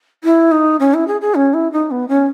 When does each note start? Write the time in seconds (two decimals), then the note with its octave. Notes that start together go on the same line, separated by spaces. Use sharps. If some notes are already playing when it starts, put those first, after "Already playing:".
0.24 E4
0.51 D#4
0.80 C#4
0.94 E4
1.08 G#4
1.21 G#4
1.35 C#4
1.54 E4
1.72 D#4
1.91 B3
2.09 C#4